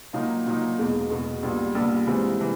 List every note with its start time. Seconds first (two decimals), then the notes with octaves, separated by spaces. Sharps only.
0.13 A#2 F#3 A#3 D#4
0.46 A#2 F#3 A#3 D#4
0.78 E2 B2 G#3
1.10 E2 B2 G#3
1.42 A#1 A#2 G3 B3
1.75 A#1 A#2 G3 B3
2.07 G#2 E3 G3 C4
2.41 E3